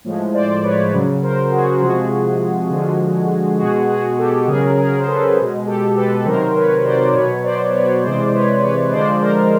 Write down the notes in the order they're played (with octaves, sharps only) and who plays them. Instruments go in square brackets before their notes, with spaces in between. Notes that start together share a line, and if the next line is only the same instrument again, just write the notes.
[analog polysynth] A2 F3 G#3
C5 D5
B4 C#5
C#3 F#3
A#4 C5
F#4 G#4
C3 F3 G#3 F#4 G#4
D3 F3 G#3
B2 G#3 F#4 G#4
F#4 G#4
G4 A4
C#3 F#3 G#4 A#4
G#4 A#4
C5
A4 B4
B2 G#3
G4 A4
A4 B4
C3 D#3 F#3 A#4 C5
B4 C#5
C5 D5
B2 F#3 B4 C#5
C5 D5
B4 C#5
C3 E3 G#3 C5 D5
B4 C#5
B4 C#5
D3 F3 G#3 C5 D5
A#4 C5